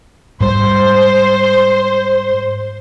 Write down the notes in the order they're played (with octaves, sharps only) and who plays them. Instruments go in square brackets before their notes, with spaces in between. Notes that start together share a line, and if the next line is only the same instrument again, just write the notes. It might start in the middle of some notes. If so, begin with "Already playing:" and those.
[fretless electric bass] G#2 G3 [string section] C5